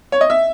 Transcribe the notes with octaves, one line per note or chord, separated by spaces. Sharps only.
C#5
D#5
E5